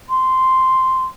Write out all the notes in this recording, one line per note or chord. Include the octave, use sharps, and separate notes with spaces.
C6